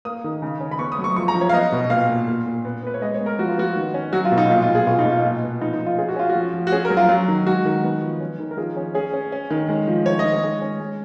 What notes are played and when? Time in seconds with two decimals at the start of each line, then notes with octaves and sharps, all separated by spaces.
0.05 A#3 D#6
0.24 D#3
0.42 C#3
0.60 C#4
0.71 B5
0.79 B3 C#6
0.92 D#6
0.98 F#3
1.04 C#6
1.16 F3 C#6
1.28 A#5
1.35 F3
1.41 C#5
1.49 F5
1.54 B3 D#5
1.72 B2
1.90 A#2 F5
2.09 A#2
2.28 A#2
2.46 A#2
2.65 B3
2.83 B3 B4
2.94 C#5
3.02 G#3 D#5
3.14 C#5
3.20 B3
3.26 A#4
3.39 F3 F#4
3.49 F4
3.57 B3 F#4
3.76 D#3
3.94 C#4
4.13 F#3 F#4
4.25 F4
4.32 B2
4.37 D#4
4.50 A#2 F4
4.62 F4
4.69 A#2
4.75 G#4
4.87 B2 F4
4.99 D#4
5.05 B2 F4
5.24 A#2
5.43 B3
5.61 F3 D#4
5.73 D#4
5.80 F3
5.86 F4
5.98 C#4 G#4
6.08 F#4
6.16 C#4 F4
6.29 F#4
6.35 F3
6.54 F3
6.67 F#4
6.72 C#4 G#4
6.85 A#4
6.90 F#3
6.97 F4
7.09 F#3
7.28 D#3
7.47 G#3 F#4
7.65 D#3
7.84 B3
8.02 F3
8.20 C#4
8.39 D#3
8.51 A#4
8.57 F3 G#4
8.77 C#4
8.94 C#4 G#4
9.14 C#4
9.32 C#4
9.50 D#3
9.69 G#3
9.88 F3
10.06 D#3 C#5
10.19 D#3 D#5
10.33 C#5
10.43 G#3
10.61 C#4
10.80 G#3